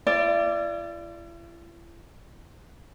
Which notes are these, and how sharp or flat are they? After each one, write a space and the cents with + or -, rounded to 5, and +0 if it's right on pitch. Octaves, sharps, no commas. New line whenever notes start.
E4 +45 D5 +0